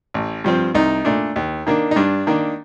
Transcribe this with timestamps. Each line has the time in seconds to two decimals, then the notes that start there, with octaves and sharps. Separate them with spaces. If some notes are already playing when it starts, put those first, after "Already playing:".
0.14 A1
0.44 G2 F3 C4
0.75 C2 D#4
1.05 A#2 A3 D4
1.36 D#2
1.67 D#3 A#3 D4
1.91 D#4
1.96 G2 D4
2.27 D#3 A#3 D4